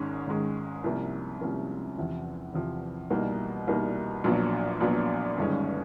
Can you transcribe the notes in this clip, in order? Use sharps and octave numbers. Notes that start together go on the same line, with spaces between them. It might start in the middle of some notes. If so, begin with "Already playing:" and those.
Already playing: G#1 G#2 D#3 G#3 C#4
G#1 G#2 D#3 G#3 C#4
C2 C3 F3 A#3 C#4
C2 C3 F3 A#3 C#4
E2 C3 F3
E2 C3 F3
C2 B2 G3 A#3 D#4
C2 B2 G3 A#3 D#4
A#1 A#2 F#3 B3 D4
A#1 A#2 F#3 B3 D4
G1 G2 D#3 G#3 C#4